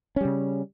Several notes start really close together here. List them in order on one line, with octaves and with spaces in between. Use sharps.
C#4 G3 C#3